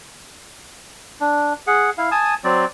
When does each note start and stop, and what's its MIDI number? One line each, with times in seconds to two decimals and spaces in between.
1.21 1.53 62
1.67 1.90 68
1.67 1.90 78
1.98 2.10 64
1.98 2.10 77
2.11 2.35 80
2.11 2.35 81
2.11 2.35 87
2.44 2.65 54
2.44 2.65 60
2.44 2.65 74